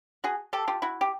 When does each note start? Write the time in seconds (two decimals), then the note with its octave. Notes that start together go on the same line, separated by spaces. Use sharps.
0.24 F#4 G#4
0.53 G4 A4
0.68 F4 G4
0.82 E4 F#4
1.01 G4